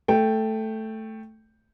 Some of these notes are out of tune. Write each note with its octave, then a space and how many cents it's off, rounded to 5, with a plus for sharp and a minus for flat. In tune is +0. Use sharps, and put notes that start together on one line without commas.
A3 +0 G5 +0